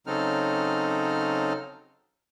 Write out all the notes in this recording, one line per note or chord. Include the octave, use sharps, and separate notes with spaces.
C#3 F#3 C4 D#4 A4 F6